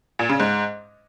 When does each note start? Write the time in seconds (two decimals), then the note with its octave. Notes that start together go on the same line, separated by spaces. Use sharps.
0.19 A#2
0.29 C#3
0.40 G#2